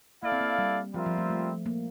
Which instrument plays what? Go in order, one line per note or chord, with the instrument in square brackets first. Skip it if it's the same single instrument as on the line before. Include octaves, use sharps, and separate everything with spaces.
[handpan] A#3 [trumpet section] E4 A4 D5 F5
[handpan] C4
A#3
G3
[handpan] F3 [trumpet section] G3 C4 F4 A#4 E5
[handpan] F3
A3
A3
A#3